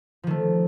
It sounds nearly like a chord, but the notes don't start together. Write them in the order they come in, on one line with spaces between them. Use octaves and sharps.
F3 D#3 A3